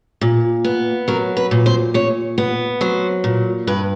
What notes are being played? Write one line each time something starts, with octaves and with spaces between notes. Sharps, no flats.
A#2
B3
F#3 A#4
B4
A#2
C5
A#2 C#5
B3
F#3 C5
A#2
G2 B4